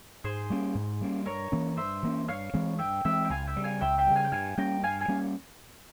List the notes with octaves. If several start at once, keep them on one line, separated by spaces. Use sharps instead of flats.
G#2 G#4 C5
G3 A#3 C#4
G#2
G3 A#3 C#4
G2 A#4 C#5
E3 A#3 C#4
G2 C5 E5
E3 A#3 C#4
G2 C#5 F5
E3 G#3 C4
G2 E5 G5
E3 G#3 C4 E5 G5
G5
C#2 F5 G#5
E5 G5
C#3 G3
F5 G#5
C#2 E5 G5
E5 G5
C#3 G3
F5 G#5
G5
G2 F5 G#5
G3 A#3 C#4 G5 A#5
G2 F5 G#5
F5 G#5
G3 A#3 C#4